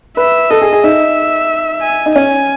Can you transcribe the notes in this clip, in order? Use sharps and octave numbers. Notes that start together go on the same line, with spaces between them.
B4 E5
A4 D#5
G#4
G#4
D#4 E5
G#5
D#4
C#4 G#5